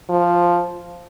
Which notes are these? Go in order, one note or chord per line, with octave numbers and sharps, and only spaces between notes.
F3